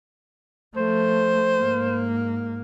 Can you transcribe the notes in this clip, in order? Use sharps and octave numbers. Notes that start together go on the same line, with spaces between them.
F3 A3 C5
G#2 A#3